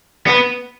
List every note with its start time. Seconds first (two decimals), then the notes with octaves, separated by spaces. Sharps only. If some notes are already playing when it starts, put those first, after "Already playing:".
0.27 B3